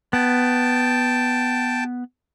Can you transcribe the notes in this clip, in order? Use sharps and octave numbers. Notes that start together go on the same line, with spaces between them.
B3 G5 A5